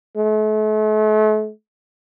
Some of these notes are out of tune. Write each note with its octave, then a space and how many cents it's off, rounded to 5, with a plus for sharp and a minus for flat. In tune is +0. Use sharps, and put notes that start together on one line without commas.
A3 -40